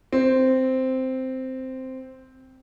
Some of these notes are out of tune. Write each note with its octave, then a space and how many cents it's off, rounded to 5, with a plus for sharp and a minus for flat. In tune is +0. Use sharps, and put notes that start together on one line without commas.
C4 -5